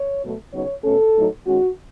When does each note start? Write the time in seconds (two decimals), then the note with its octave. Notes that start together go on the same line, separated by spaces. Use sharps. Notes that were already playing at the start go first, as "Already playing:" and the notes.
Already playing: C#5
0.22 B2 F#3 A3
0.53 C#3 F#3 B3 D#4 C#5
0.84 B2 A3 C#4 A4
1.16 A2 F#3 A3 D#4
1.47 D#3 G#3 C#4 F#4